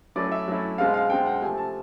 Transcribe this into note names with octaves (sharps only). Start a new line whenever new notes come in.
F#3 A3 C#4 E4 D5
E5
F#3 A3 C#4 E4
B2 G#3 C4 F5
F5
B2 G#3 C4 G5
F#5
C3 F3 A3 G#5
A5